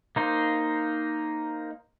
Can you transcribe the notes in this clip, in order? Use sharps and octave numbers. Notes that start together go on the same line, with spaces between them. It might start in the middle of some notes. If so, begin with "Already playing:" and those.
A#3 D#4 C5